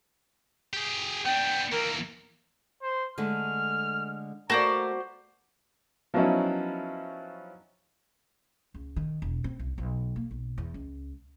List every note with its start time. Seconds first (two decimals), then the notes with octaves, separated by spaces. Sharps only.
0.73 G4 G#4
1.26 B3 D4 G5
1.72 E3 A#3 A#4
2.82 C5
3.18 D3 G#3 A3 F6
4.50 A3 A#3 F#4 C5 D5 A#5
6.14 F3 F#3 B3 C#4 D#4 E4
8.74 C#2
8.96 D#3
9.22 E1
9.44 C4
9.59 C2
9.78 B1
10.16 A#3
10.31 B1
10.58 E2
10.74 C#2